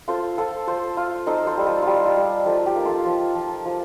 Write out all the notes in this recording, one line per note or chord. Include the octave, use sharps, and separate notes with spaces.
F4 A4 C5
F4 A4 C5
F4 A4 C5
F4
D#4 A4 C5
A4 C5
G3
F4 A4
G3 F4 G4
F4
G3
F3 F4 A4
A4
G4
A#3
F4 A4
F3
F3
F3